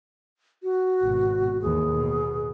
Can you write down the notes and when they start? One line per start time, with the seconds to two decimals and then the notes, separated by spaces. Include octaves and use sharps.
0.63 F#4
1.02 G#1 B2
1.62 D#2 E3 G#4
1.95 B2